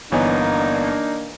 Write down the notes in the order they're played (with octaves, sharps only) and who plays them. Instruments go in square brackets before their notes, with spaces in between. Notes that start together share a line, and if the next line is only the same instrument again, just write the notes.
[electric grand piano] G1 B3 [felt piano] E3 C#5 G#5 [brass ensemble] A#3 D4 [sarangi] D#4